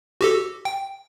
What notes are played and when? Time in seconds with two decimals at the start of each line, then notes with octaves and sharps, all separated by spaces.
0.21 F#4 G4 A4
0.65 G5